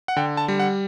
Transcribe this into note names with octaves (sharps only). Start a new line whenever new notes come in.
F#5
D3 G5
A5
G3
F#5